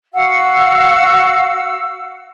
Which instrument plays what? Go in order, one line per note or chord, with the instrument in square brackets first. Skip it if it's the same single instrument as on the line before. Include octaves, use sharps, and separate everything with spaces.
[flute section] F#4 F5 F#5 E6